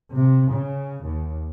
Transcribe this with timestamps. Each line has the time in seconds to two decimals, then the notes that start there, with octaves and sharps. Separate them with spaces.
0.12 C3
0.48 C#3
1.03 D#2